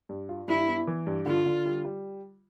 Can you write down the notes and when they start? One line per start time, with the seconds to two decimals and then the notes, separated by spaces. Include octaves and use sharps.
0.09 G2
0.29 F4
0.48 G2 E4
0.68 B3
0.87 E3
1.07 G2
1.26 D3 F4
1.46 D3
1.65 G3
1.85 G3